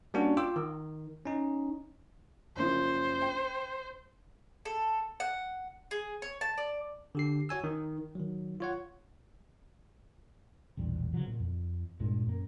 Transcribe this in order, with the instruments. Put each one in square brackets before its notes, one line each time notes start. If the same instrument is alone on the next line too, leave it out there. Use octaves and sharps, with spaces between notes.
[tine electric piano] G3 A#3 C#4 D4 F#4
F4 G5 D6 E6
D#3
C#4 D#4
[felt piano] F#1 F#2 F3 [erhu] C5
[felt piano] G5
[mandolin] A4
F#5
G#4
C#5
A5
D5
[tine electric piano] D3 G4 C7
F#4 C#5 G#5 E6
D#3
D#3 F#3
F4 C#5 F#5
[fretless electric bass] E1 A#1 G3
C#3 F3 F#3
A#2
F2
G2 A#2 G#3
F#2 A#3